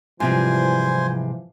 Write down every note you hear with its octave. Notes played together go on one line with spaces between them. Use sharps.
G#2 C3 E3 F3 G3 C5 G#5 C6